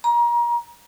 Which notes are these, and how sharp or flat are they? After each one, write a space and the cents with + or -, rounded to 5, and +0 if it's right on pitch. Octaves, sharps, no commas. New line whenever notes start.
A#5 +30